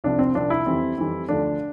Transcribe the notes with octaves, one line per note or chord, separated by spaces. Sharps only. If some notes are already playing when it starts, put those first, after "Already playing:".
C2 C3 F3 D4
C4
C2 C3 F3 D4
E4
F2 E3 G3 C4
F2 E3 G3 C4
D2 D3 F3 A3 D4